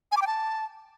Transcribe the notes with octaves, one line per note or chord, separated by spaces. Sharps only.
G#5
D6
G5
A5